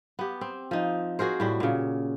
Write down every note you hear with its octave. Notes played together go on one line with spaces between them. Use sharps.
B3 G4
C4
F3 D#4
F#4 G#4 A#4 C5
A2 G3 F#4
A#2 C#3